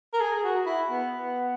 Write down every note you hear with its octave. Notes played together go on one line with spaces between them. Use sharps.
A#4
G#4
F#4
E4
B3